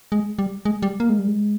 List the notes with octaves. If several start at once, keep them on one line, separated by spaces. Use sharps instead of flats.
G#3
G3
G#3
G3
A#3
G#3
G3
G#3